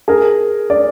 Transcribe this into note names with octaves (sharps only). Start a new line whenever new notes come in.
G#4 A#4
D5